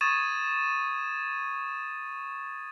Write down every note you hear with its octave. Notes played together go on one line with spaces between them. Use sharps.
C#6 D#6 G#6 A6 D#7 E7